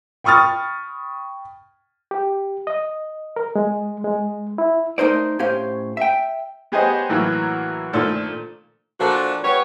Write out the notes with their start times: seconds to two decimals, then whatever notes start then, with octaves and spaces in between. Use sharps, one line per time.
0.24 G5 B5 C#6 D#6 F6 A6
2.11 G4
2.67 D#5
3.36 A#4
3.56 G#3
4.04 G#3
4.58 E4
4.98 A3 D#4 A#4 C5 D5
5.39 A2 C#4 G4 C5 F5
5.97 E5 G5
6.72 B3 G4 G#4 C5 C#5 D#5
7.09 A2 E3 F#3 A#3 F#4
7.93 A#2 D#3 F3 A3 D4 A4
8.99 A#2 F3 D4 F#4 A4
9.44 G3 B3 C#5